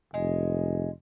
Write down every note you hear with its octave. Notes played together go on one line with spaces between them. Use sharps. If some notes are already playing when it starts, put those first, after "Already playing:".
F1 G#3